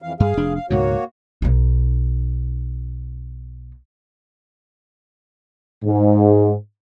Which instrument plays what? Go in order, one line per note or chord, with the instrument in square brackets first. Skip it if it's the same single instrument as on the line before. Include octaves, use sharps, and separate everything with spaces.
[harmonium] F2 E3 F5
[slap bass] G2 [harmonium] G#4 F5
[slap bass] F1 D4
[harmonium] F5
[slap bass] C#2 G#2 B2 [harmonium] A#3 F#4 C#5
[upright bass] B1 D#4
[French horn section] G#2